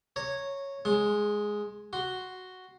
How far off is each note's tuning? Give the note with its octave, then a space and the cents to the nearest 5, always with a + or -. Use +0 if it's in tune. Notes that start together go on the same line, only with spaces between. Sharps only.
C#5 -5 A#5 -20
G#3 +0 C6 +30
F#4 +0 C6 +0